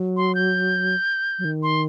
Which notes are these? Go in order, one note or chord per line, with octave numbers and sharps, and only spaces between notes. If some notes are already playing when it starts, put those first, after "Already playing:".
Already playing: F#3
C6
G6
F#3
D#3
C6